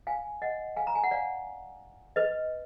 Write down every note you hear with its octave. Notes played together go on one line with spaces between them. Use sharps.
F5 G#5
D#5 F#5
F5 G#5
A#5
G#5
F#5
D5 F5
B4 D#5